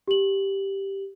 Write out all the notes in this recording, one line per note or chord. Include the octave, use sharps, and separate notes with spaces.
G4 F#7